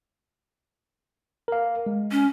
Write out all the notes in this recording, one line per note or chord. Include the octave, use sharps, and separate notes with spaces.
A#4 F5
G#3
C#4